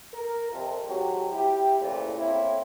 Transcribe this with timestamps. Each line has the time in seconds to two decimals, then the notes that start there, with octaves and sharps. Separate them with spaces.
0.14 A#4
0.52 F2 C3 F3
0.88 F2 G#2 F#3 C4 F#4 G4
1.32 E4 G4
1.81 G2 A#2 C#3 E3 A3 C5
2.19 A2 A#3 C4 C#4 E4